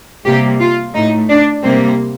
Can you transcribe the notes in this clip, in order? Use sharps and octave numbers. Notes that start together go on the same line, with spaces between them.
C3 G3 A#3 G4
F4
A2 A3 D#4
D4
C3 G3 A#3 C4